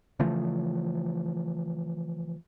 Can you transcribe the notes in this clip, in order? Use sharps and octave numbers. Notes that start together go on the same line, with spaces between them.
C#3 E3 F3 A3